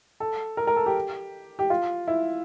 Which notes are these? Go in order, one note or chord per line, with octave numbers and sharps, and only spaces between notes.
A4
A#4
A#4
A4
G4
G4
F4
E4